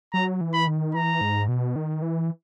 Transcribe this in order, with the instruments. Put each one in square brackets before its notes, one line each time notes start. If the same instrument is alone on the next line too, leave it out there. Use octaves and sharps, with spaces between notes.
[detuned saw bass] F#3 [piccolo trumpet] A#5
[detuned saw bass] E3
[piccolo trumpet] B5
[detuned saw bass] D#3
[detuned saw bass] E3 [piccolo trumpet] A#5
[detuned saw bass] G#2
B2
D#3
E3